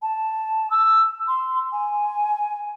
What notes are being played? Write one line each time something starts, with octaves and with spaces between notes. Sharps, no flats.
A5
E6
C6
G#5